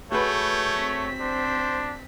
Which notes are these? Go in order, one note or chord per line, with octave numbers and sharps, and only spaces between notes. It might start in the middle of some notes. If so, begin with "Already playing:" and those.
A3 F#4 G#4 B4 C#5 G6
C4 B6
D4 C5